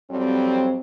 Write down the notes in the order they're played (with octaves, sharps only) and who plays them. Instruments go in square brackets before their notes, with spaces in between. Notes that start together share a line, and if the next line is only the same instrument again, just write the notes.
[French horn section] F2 F#3 G3 C4